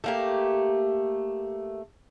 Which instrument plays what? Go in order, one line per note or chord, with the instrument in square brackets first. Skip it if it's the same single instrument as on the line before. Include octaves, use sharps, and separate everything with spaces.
[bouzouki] A3 A#3 G4